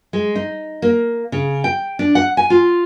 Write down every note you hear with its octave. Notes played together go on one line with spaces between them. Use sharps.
G#3
D#4
A#3
C#3
G5
D4
F#5
G#5
F4